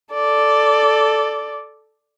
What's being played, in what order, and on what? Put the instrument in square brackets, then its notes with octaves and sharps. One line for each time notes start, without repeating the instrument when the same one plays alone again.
[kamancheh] A4 D5